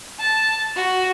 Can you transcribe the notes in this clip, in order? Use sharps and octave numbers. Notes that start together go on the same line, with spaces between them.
A5
F#4